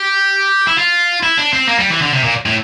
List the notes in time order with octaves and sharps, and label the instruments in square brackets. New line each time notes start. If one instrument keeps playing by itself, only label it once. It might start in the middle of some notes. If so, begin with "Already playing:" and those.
Already playing: [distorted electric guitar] G4
E4
F4
E4
D4
C4
A#3
G3
E3
D3
C3
A#2
A2